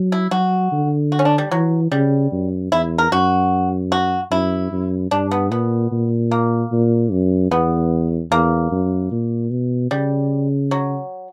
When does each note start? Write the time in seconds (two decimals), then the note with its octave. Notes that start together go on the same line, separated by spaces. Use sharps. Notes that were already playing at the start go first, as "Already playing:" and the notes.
Already playing: F#3
0.12 E4
0.31 F#3 F#4
0.72 D3
1.12 F#4
1.19 C#4
1.25 D4
1.38 G3
1.51 E3 F#3
1.92 C#3 G3
2.32 F#2
2.72 E2 E4
2.98 A#4
3.11 F#2 F#4
3.92 F#4
4.31 F#2 E4
4.72 F#2
5.11 G2 D4
5.31 B3
5.51 A#2 B3
5.92 A#2
6.31 A#3
6.72 A#2
7.11 F#2
7.51 E2 B3
8.31 E2 A#3
8.71 F#2
9.12 A#2
9.51 B2
9.91 C#3 G3
10.71 F#3